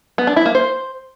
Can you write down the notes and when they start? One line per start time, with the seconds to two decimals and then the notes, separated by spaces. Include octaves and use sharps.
0.18 B3
0.27 D4
0.36 E4
0.46 A#3
0.55 C5